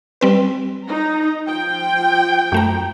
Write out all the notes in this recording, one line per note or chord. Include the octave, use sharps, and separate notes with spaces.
G3 C4 B4
D#4 A#5
F3 G5
F#2 A3 A#5